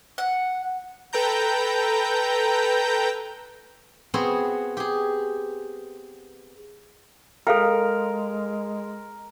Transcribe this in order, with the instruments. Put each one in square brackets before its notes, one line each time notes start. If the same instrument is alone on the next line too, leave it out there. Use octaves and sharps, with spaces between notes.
[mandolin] F#5
[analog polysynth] A4 B4 G5 A#5 G6
[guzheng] B3 C4 F#4 G#4 C#5
G4 G#4
[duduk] G#3 [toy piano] A4 F5 G5 [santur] A#4